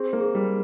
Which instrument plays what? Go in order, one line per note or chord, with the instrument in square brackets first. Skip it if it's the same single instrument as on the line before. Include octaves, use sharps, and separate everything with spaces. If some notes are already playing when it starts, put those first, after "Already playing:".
Already playing: [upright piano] C4 [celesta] G#4
[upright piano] A#3
[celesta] G#4
[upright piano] G3